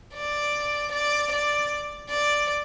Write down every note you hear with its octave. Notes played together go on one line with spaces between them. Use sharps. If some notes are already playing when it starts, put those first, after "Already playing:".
D5
D5
D5
D5